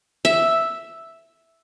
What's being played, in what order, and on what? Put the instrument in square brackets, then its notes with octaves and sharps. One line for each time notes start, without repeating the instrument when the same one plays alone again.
[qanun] E5